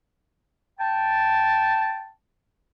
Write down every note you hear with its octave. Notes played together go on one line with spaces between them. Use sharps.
G5 A5